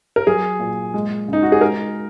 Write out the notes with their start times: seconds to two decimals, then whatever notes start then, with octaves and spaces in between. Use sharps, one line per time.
0.16 A#4
0.27 F#3 G#4
0.59 A#2
0.94 G#3
1.28 C#3 D#4
1.43 F#4
1.52 G#4
1.61 G#3 A#4